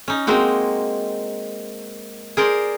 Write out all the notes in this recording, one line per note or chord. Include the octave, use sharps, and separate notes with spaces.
C#4 D#4
G#3 A#3 C4 D#4 F#4
G#4 A#4 C5 D5